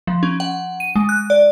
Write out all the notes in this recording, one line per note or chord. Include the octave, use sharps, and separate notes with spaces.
F3
C#4
F#5
D#7
G#3
F#6
D5